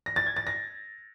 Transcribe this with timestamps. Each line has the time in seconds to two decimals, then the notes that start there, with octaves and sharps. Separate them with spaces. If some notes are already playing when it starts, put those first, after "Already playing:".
0.06 A#6
0.16 A6
0.26 G#6
0.37 A6
0.47 A#6